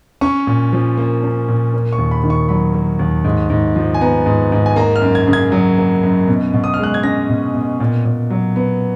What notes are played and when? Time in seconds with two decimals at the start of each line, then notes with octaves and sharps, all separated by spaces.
0.21 C#4 C#6
0.47 A#2
0.73 F3
0.98 A#3
1.23 C#4
1.48 A#2
1.73 A#3
1.93 C#6
1.98 D#2
2.11 B5
2.24 D#3
2.30 C#6
2.49 F#3 B5
2.74 A#3
2.99 D#2
3.24 G#2
3.50 G#2
3.76 F3
3.94 G#5
4.01 B3 A#5
4.26 G#2
4.52 G#2
4.66 G#5
4.76 A#3 A#5
4.96 F6
5.02 F#2
5.15 G#6
5.27 C#3
5.33 G#6
5.52 F#3
5.78 A#3
6.03 F#2
6.28 B2
6.53 B2
6.64 D#6
6.74 F6
6.79 G#3 F#6
6.94 G#6
7.03 C#4 A#6
7.29 B2
7.54 B2
7.80 A#2
8.05 A#2
8.30 F#3
8.56 B3